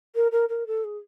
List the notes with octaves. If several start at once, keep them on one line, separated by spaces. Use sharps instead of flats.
A#4
A#4
A#4
A4
G#4